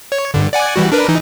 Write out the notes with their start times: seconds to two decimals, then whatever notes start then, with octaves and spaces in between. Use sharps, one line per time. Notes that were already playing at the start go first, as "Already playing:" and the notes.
0.12 C#5
0.34 G2 D3
0.53 D5 F#5 G#5
0.76 E3 G3 F#4
0.92 D4 A#4 B4
1.09 E3 D#4